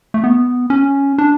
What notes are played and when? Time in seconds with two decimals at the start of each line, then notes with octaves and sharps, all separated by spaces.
0.14 A3
0.24 B3
0.70 C#4
1.18 D4